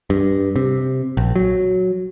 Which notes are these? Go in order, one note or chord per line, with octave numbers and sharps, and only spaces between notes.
G2
C3
A#1
F#3